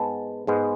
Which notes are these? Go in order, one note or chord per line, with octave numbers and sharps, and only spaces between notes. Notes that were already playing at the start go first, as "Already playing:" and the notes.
Already playing: G#2 G#3 B3 A5
G#2 G#3 B3